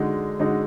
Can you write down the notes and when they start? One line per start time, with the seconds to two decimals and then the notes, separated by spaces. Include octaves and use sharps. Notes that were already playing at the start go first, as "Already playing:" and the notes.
Already playing: D3 G#3 D#4 F#4
0.40 D3 G#3 D#4 F#4